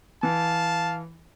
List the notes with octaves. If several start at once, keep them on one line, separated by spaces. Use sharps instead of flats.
E3 F5 A5